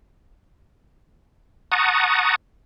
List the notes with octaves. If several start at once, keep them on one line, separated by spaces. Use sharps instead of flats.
F#5 A5 A#5 C#6 D#6